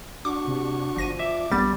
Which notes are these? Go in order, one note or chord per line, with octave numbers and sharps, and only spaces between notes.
D4 F#4 C#6 D6
C3
G1 F3 A#6 D#7
D5 E5 D6
A#1 G3 B3 A6